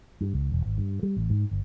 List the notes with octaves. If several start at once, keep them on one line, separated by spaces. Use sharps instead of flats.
G2
C#2
E1
G#1
G2
G3
A1
G#2
G1